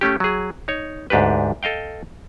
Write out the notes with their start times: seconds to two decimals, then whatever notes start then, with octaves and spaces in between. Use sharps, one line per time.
0.01 A3 C#4 G4
0.20 F#3 G#4
0.68 D#4 C#5
1.10 D2 G#2 D4 G4 B4
1.63 A4 D#5 F5 G5